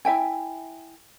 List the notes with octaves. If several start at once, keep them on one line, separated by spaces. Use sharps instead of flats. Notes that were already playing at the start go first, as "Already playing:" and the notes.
E4 E5 G5 G#5